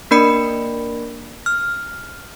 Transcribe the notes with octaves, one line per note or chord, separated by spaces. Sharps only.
A#3 D4 A#4 D5 B5 C#7
F6